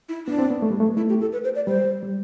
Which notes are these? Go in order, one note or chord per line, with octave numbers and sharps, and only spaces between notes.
E4
B3 D4
C4
B3
A3
G3
A3
B3
A3 E4
G4
A4
B4
C5
D5
G3 C5
G3